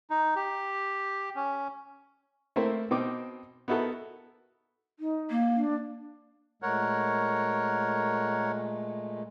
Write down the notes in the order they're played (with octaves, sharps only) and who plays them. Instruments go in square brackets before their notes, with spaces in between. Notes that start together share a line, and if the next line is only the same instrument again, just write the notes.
[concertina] D#4
G4
C#4
[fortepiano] A3 A#3 C4 E4 A#4 C5
B2 C4 D#4 D6
B3 D#4 E4 F#4 A4 A#4
[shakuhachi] D#4
[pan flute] A#3
[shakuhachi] D4
[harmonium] A#2 G#3 A3 [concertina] A#4 C#5 F#5